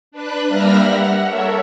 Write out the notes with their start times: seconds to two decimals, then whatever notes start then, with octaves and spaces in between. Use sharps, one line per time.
0.12 D4 B4 F#6
0.48 G3 A#3 E5 B5 F6 A#6
0.81 F#5
1.24 A4 A#4 C#5 E5